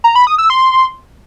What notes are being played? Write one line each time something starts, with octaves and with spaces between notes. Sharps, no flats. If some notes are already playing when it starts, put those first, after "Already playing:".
A#5
B5
D#6
E6
C6